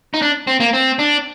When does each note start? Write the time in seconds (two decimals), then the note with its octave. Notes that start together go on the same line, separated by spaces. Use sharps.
0.14 D#4
0.22 D4
0.47 C4
0.60 A#3
0.73 C4
0.99 D4